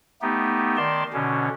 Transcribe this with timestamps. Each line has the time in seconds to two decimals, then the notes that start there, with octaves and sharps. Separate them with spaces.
0.22 A3 B3 D#4 G4
0.77 D#3 D5 A5 C6
1.13 B2 D3 C#4